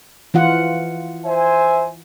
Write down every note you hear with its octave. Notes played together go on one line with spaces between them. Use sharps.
E3 F4 F#5
C5 E5 G#5